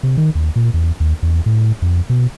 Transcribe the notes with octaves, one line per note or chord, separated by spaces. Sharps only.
C3
D#3
D#2
A#2
E2
D#2
E2
A2
F2
B2